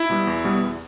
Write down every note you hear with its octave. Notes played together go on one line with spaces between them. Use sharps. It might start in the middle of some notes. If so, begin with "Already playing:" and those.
Already playing: E4
B2 G3 B3
E2
B2 G3 B3
E2